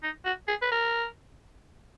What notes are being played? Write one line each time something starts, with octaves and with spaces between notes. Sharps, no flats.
D#4
F#4
G#4
B4
A#4